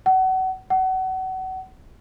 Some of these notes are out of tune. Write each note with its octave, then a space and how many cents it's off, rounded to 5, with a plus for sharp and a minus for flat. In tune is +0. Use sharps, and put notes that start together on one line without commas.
F#5 +30
F#5 +30